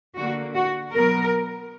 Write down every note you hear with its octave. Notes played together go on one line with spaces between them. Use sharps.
D3 A#3 F#4
F#4
B2 F#3 B3 A#4